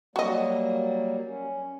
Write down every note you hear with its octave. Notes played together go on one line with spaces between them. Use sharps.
F#3 G3 A#3 F#4 D#5
C#4